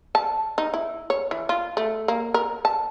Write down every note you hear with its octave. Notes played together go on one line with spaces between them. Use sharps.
A5
D#4
E4
C#5
E3
F4
A3
A#3
A#4
A5